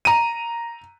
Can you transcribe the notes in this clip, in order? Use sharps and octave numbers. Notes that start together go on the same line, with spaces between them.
A#5 D#7